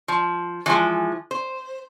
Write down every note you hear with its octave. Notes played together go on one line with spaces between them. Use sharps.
F3
E3 F3 G#3
C5